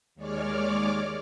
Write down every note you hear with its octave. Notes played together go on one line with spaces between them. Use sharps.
D#2 G#3 C#5 D5 D6 F6